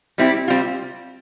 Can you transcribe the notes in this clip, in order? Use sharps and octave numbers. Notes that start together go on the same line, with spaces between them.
G3 C4 E4 G4
G3 C4 F4